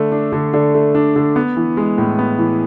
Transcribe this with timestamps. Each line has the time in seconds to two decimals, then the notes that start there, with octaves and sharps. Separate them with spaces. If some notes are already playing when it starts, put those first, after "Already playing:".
Already playing: D3 A3
0.12 D4
0.32 D3
0.54 D3
0.75 A3
0.95 D4
1.16 D3
1.36 B3
1.57 E3
1.77 G#3
1.98 A2
2.19 B3
2.39 E3